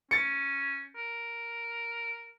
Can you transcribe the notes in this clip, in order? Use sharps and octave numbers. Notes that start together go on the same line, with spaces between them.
C#4 A6 C#7
A#4